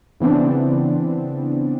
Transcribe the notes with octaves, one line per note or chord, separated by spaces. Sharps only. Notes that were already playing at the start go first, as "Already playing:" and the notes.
C#3 E3 B3 C4 D4